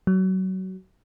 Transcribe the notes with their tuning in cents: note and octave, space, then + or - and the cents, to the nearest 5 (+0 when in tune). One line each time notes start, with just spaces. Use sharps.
F#3 +25